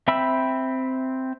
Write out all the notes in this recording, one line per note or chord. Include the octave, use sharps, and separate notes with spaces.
C4 E5 G5 B5 E6